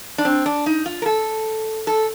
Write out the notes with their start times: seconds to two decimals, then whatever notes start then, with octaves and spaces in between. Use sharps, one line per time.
0.18 D4
0.25 C4
0.46 D4
0.66 D#4
0.86 F4
1.02 A#4
1.06 A4
1.87 A4